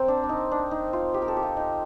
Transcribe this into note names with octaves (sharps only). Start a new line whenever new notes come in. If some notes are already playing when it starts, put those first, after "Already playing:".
Already playing: C4 A#4
D4
D4
D#4
D4
D#4
F4
G4
A#4
A4
G4
F4
D#4